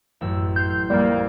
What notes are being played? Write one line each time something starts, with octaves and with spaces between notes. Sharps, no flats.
A1 F#2 E6
C6 F6 G6 C7
F2 G3 A#3 E6 A6